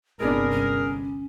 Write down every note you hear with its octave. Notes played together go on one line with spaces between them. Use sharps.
G1 C2 G#3 B3 C4 D4 G#4 A#4
C#4